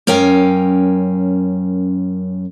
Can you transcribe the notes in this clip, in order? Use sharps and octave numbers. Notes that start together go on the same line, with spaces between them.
F#2 C#4 A#4 F5 G5 G#5